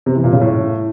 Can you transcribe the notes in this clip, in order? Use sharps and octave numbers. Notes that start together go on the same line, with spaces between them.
C3
E3
A#2
C#3
A2